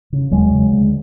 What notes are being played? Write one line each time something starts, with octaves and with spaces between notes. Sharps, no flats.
C#3
D#2 F#3 G#3
C#3
D2